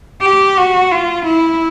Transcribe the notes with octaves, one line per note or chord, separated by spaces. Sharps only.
G4
F#4
F4
E4